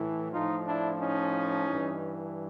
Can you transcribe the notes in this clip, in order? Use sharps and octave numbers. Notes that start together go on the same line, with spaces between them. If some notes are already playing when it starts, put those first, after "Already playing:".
Already playing: A2 E3
A2 F3 D#4 F4
D4 E4
C#4 D#4
G2 E3